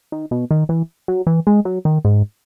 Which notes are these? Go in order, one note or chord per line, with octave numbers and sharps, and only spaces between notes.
D#3
B2
D#3
E3
F#3
E3
G#3
F#3
D#3
G#2